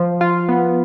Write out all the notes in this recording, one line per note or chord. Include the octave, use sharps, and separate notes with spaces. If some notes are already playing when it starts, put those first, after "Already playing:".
Already playing: F3 F4
F4
B3